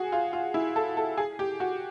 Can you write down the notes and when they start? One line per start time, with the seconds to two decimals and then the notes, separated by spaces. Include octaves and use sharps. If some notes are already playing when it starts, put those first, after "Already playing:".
Already playing: F#4 G#4
0.12 F4
0.33 F4
0.54 E4
0.76 A4
0.97 A4
1.18 G#4
1.39 G4
1.60 F#4